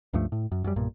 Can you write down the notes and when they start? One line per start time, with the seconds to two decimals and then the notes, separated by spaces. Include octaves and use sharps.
0.13 C#2 G2 F3 A3
0.32 A2
0.52 F#2
0.64 F#2 G3
0.76 B1 G2 A#2